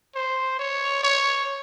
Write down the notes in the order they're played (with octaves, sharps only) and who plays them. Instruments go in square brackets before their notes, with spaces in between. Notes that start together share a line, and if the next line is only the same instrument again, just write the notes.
[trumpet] C5
C#5
C#5